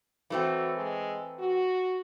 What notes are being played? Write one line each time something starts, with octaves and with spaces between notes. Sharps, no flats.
E3 F#3 A3 C4
G#3
F#4